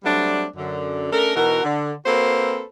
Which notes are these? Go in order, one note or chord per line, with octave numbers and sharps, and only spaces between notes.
F#3 G3 A3 C4 D4
F#2 D3
A3 C#4 D4 A4 A#4
B2 E3 D#4 F#4 A#4
D3
A#3 C4 F#4 A4 B4 C5